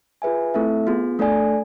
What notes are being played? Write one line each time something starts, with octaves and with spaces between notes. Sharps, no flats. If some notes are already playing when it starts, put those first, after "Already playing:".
F4 G#4 B4 E5 G#5
A3 C4 E4 A4 E5
B3 F4 G#4
A3 D4 A4 D5 G#5